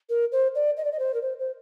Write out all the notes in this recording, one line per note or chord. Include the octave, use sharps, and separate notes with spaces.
A#4
C5
D5
D#5
D5
D#5
C5
A#4
C5
C5